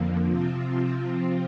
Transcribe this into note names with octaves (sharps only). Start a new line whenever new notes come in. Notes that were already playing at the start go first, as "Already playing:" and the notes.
Already playing: F2 D3 F3 A#3
C3 F3 C4 F4